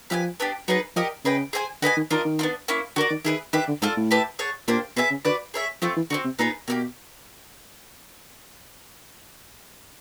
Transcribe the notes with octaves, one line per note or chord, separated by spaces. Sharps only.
F3 G4 B4 E5 G#5
B3 D4 G4
F#3 B3 D#4 G#4 B4
F3 G4 A#4 D#5 F#5
C#3 G#4 B4 D#5 G5
G#4 C5 E5 G#5
D3 F#4 B4 D#5 G#5
D#3
D#3 D4 F4 A#4 D#5
D#3
B3 D4 F4
A#3 C#4 E4
D3 F#4 A#4 D5
D#3
D#3 E4 G#4 B4
D#3 D4 G4 B4 E5
D3
G#2 F4 A4 D5
A2
G4 B4 E5 A5
G#4 C#5 F#5 A5
A#2 A#3 D4 G4 C5
B2 G#4 B4 E5 G#5
C#3
D3 F#4 B4 D5
G#4 C#5 E5
F3 A3 C4 F4
E3
D3 C4 D#4 F#4
C3
A#2 B3 D#4 G#4 B4
B2 A#3 D#4 G4